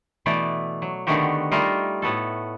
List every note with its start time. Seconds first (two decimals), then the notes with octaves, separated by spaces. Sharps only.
0.26 B2 E3 A3 B3 D5
0.82 F#3
1.07 D3 D#3 A3 B3 F#4 G4
1.52 G3 A3 D#4 F4 A#4
2.02 A2 B3 F#4 A4